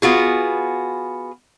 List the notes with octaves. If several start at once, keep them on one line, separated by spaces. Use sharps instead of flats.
B3 F4 F#4 G#4